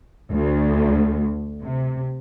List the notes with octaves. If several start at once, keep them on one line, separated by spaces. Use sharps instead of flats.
D2
C3